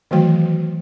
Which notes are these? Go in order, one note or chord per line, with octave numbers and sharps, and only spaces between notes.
D#3 E3 F#3 A3 F#4 G5